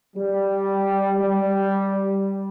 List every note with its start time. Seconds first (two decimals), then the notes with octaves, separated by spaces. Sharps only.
0.16 G3
1.20 G3